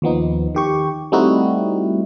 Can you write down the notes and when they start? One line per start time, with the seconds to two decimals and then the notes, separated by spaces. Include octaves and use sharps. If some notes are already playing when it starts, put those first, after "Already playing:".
0.02 D#2 F3 B3 D#4
0.55 D#3 G4 C#6
1.12 G3 A3 C4 D#4 E4 F#4